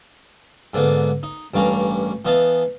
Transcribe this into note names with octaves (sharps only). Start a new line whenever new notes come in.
G#2 D3 A#3 B3
D#4
A1 G2 A#3 C#4 A#5
E3 B3 D#5 F5 A5